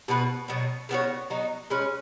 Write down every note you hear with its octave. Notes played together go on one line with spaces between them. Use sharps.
B2 B3 F#4 B4
B2 F#3 B3
C#3 B3 F#4 C#5
F#3 B3 D#4 F#4
G#3 C#4 B4